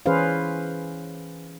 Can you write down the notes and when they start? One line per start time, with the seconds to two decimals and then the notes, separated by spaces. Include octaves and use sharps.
0.06 E3 C#4 G#4 B4 C5 F5